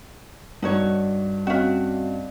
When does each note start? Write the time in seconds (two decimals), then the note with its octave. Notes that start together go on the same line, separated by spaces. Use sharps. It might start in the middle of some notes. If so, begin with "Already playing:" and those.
0.62 G2 D#4 F#4 C#5
1.47 C4 C#4 F#4 D#5 F5